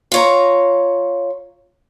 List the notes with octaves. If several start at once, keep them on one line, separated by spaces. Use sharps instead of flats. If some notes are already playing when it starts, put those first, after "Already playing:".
F4 C#5 A#5